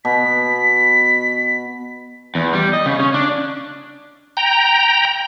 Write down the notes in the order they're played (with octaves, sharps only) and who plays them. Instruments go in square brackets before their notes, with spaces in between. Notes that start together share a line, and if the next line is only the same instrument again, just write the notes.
[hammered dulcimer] B2 [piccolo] B6
[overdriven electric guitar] E2
G3
D#5
C#3
C#4
D4
[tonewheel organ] G5 A#5